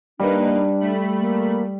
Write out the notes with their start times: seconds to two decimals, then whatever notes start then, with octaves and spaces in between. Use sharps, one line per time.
0.19 G3 A#3 D4 D#4 B4
0.80 A3 B5
1.20 A#3